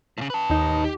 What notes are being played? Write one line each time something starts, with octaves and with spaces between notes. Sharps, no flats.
A2 C#3
B4 A5
D#2 D#4
G4